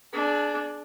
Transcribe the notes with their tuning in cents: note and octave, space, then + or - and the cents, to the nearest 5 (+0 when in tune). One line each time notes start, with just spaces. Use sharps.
D4 +0 G#4 +30